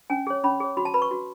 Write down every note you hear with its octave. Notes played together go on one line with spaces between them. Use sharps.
C#4 G#5
G#4 C#5
C#4 B5
G#4 C#5
F#4 B5
A5
B4 B5
C#6
F#4